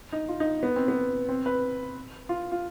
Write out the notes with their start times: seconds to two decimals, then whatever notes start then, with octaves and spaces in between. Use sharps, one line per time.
0.12 D#4
0.29 F4
0.40 D#4
0.63 B3
0.76 C4
0.88 B3
1.29 C4
1.46 B4
2.29 F4
2.52 F4